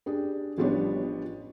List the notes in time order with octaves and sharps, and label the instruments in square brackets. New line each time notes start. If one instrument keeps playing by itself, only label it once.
[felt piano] D4 G4 G#4
A1 F3 G3 B3 D4 C#5